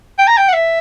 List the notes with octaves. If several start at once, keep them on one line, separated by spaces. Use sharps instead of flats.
G5
A#5
G5
F#5
E5